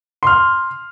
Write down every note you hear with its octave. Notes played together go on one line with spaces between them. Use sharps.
C6 F6